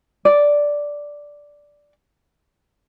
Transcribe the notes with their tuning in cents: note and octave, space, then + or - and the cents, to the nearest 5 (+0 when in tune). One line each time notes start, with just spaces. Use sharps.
D5 -5